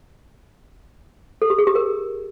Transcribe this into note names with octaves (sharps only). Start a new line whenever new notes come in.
A4
G4
G#4
G4
A#4